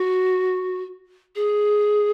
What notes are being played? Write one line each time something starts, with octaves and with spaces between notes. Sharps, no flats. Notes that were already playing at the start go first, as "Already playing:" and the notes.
Already playing: F#4
G#4